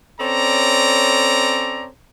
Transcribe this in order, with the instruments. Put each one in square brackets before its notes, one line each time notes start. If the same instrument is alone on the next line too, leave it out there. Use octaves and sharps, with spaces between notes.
[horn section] C4 C#4 A4 C#5 D5 A#5